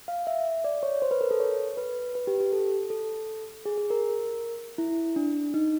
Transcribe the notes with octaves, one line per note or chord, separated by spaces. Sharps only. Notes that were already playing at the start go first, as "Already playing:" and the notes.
F5
E5
D5
C#5
C5
B4
A#4
A4
C#5
B4
B4
G4
G4
A4
A4
G#4
G#4
A#4
E4
D4
D#4